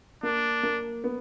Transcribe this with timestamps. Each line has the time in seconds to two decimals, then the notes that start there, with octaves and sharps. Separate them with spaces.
0.23 A#3 D4
0.63 A#3
1.04 B3